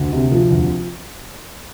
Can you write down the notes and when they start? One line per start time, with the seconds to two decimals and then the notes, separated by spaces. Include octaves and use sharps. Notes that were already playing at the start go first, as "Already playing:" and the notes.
Already playing: D2
0.13 C3
0.32 F3
0.51 D2